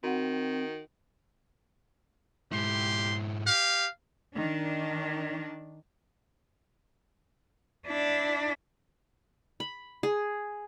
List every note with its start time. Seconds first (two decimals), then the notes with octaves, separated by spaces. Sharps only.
0.03 D#3 C4 F#4 F#5
2.52 G#2 E4 G4 C6
3.47 G4 F5
4.36 D#3 D4
7.86 D4 E4
9.60 B5
10.03 G#4